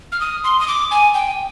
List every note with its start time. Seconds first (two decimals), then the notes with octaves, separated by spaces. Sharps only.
0.12 F6
0.20 D#6
0.44 C6
0.59 D#6
0.68 D6
0.91 G#5
1.14 G5